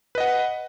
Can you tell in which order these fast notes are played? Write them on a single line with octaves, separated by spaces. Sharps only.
B4 D#5 F#5